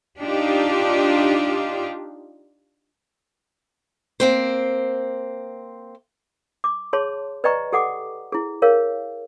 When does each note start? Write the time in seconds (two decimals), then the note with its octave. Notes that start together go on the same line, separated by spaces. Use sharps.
0.21 D4 D#4 F4 G4
4.20 A#3 C4 C5
6.64 D6
6.93 G#4 C#5 A5 C6
7.44 B4 D5 D#5 G5 A#5 C#6
7.73 G4 A4 F#5 G5 D6
8.32 E4 G#4
8.62 G#4 A#4 C#5 F5